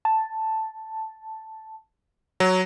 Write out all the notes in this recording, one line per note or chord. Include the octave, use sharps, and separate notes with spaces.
A5
F#3